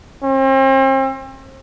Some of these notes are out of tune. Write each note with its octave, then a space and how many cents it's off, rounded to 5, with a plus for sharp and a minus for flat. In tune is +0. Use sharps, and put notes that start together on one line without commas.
C4 +40